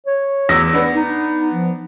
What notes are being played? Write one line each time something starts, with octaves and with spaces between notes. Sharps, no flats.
C#5
E2 E6 A#6
B3 D4
D#4
F3